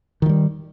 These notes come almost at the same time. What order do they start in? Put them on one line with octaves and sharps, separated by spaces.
D#3 F3 G3